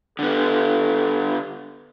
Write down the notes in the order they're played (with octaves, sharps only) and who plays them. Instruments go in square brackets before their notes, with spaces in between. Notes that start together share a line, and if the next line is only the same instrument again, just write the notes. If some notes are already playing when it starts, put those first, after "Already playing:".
[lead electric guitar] D3 B3 [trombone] A4